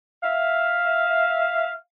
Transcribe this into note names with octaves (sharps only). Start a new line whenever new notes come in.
E5 F5